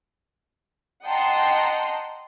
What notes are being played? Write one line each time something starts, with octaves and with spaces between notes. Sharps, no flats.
D#5 F#5 G5 A5 A#5 C6